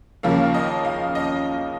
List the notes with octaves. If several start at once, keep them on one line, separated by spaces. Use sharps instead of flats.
D#2 C#3 F3 A#3 F5
D#5
F5
D#5